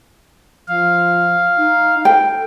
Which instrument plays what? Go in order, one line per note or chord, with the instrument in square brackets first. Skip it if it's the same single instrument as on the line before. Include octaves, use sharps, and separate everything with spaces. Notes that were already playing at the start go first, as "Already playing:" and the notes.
[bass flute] F3 [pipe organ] F5
[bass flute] D#4
[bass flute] A4 [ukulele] G5